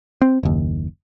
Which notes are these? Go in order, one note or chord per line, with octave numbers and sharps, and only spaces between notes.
C4
F#1 D#2